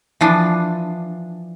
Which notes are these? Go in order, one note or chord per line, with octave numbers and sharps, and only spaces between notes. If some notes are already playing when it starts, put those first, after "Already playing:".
E3 F3 D4